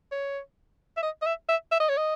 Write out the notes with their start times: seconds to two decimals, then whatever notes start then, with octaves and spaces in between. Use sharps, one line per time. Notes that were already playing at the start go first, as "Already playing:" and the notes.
0.11 C#5
0.97 E5
1.03 D#5
1.22 D#5
1.26 E5
1.49 E5
1.71 E5
1.80 D#5
1.89 C#5
1.97 D#5